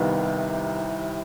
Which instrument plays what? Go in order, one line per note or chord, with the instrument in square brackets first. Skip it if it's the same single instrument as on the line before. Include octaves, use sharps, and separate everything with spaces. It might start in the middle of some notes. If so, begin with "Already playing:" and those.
Already playing: [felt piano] C2 C3 D#3 G3 B3 F5